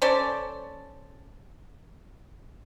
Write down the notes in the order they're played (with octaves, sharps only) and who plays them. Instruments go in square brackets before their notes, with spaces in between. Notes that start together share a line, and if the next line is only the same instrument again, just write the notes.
[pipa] C#4 A4 C5 D5